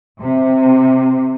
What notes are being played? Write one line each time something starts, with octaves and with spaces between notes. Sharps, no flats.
C3